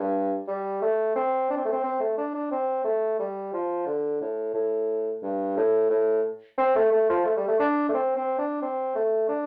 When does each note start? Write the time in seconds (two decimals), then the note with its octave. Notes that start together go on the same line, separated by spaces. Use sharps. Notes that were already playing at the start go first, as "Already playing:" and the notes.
Already playing: G2
0.47 G3
0.82 A3
1.16 C4
1.50 D4
1.57 C4
1.65 A3
1.72 C4
1.84 C4
2.00 A3
2.17 D4
2.34 D4
2.51 C4
2.84 A3
3.19 G3
3.53 F3
3.86 D3
4.21 A2
4.54 A2
5.22 G2
5.57 A2
5.90 A2
6.58 C4
6.75 A3
6.91 A3
7.09 F3
7.25 A3
7.37 G3
7.47 A3
7.59 D4
7.89 A3
7.94 C4
8.16 C4
8.38 D4
8.62 C4
8.95 A3
9.29 D4